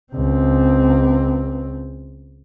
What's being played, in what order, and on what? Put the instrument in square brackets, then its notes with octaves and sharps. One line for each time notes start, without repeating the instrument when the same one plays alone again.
[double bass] C#2 C4